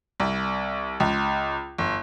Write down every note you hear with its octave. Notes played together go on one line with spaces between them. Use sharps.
C2
C#2
G1